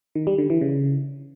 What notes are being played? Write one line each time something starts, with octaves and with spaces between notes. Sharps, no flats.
D#3
G3
D3
E3
C#3